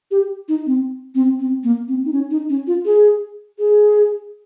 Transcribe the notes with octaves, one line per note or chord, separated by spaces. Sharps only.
G4
D#4
C4
C4
C4
A#3
C4
D#4
C#4
D#4
C#4
F4
G#4
G#4